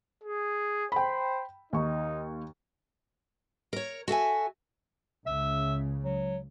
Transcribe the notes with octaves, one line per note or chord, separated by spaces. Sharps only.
G#4
C5 G5 B5
D#2 D#4 C#6
A#4 C#5
F#4 A4 E5 G#5
C#2 C#3 E5
F#3